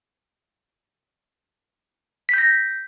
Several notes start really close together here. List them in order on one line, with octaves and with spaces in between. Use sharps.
B6 G6 A#6